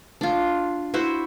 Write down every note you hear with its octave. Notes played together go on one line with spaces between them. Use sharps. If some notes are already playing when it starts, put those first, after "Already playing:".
D4 F4
E4 F#4 C5